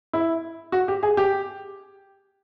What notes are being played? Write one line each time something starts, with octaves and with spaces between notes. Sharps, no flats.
E4
F#4
G4
G#4
G4